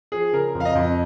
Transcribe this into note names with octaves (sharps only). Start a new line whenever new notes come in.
F3 G#4
C#3 A#4
F2
F5
D#5
F2